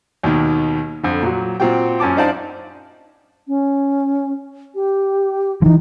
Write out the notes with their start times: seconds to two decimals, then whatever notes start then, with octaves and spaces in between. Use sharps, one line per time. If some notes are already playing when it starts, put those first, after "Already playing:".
0.23 D#2 B2 D#3
1.03 F2 D3
1.23 A#2 F#3
1.60 A#2 C4 F4 F#4 G5
2.00 F#2 C#4 A5 D6
2.17 D4 D#4 C5 D5 F5 A5
3.48 C#4
4.75 G4
5.62 E3 F3 D#4